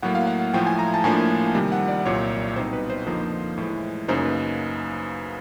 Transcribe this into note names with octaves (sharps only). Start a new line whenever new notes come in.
A2 F#3 A#3 F#5
F5
F#5
A2 F3 A3 G5
G#5
A#5
A5
A2 F3 A#3 D4 G#5
C3 D#3 G3
F#5
D5
C2 A#2 F#3 C#5
B2 G3 C4 D#4 C5
B4
C5
F2 D3 F3 A#3 D#4
A2 E3 G#3
F#2 C#3 F#3 A#3 D#4 C5
B4